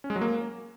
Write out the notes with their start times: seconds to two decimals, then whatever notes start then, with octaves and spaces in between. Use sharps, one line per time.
0.04 C#4
0.10 G#3
0.16 F#3
0.21 A#3